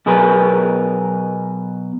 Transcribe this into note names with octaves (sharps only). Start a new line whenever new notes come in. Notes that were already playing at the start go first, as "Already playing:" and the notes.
B2 F#3 G#4 A#4 B4